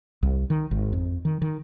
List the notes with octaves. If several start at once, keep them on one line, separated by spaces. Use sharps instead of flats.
C2
D#3
G#1
F2
D#3
D#3